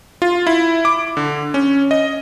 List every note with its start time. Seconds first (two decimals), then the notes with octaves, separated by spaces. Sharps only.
0.22 F4
0.47 E4
0.85 D6
1.17 D3
1.54 C#4
1.91 D#5